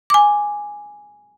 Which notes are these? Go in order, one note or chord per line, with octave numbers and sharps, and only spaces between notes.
G#5 D6